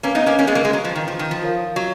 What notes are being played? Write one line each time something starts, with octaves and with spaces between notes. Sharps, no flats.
A#3 C#4 B4 F5 A#5
B3 D#4
A#3 C#4
A#3 C#4
G#3 B3
F#3 A#3
G#3
F#3
F3
D#3
F3
D#3
F3
F4 A#4 C#5 F5
F#3